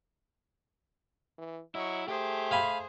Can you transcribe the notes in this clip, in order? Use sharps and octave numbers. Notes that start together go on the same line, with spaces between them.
E3
F#3 E4 D#5 C#6
A3 G4 G#4 C5
F5 G#5 B5